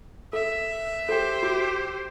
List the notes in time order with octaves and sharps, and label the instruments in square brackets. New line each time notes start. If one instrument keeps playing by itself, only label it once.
[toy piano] A4 [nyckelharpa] E5
[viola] G4 C5 [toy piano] A4 G5
[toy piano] F#4